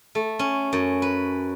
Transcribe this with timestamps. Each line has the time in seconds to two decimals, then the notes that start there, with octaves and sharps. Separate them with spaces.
0.15 A3
0.39 C#4
0.73 F#2
1.02 B4